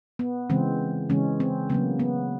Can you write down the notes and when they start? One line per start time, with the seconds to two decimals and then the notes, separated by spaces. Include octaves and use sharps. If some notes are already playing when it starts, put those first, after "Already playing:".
0.19 B3
0.50 C#3 E3 G#3 C4
1.10 C#3 E3 G#3 C#4
1.40 C4
1.70 C#3 F#3 A#3 B3
1.99 B3